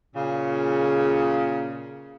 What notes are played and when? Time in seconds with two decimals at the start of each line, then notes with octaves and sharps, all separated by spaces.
0.15 A#2 C#3